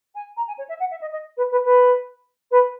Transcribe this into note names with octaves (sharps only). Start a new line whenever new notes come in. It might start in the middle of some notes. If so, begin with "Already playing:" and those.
G#5
A#5
G#5
C#5
E5
F#5
E5
D#5
D#5
B4
B4
B4
B4